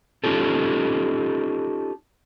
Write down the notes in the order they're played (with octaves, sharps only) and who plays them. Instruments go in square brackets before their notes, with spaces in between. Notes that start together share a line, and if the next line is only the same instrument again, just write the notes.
[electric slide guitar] C#4 D#4 F4 G4 A4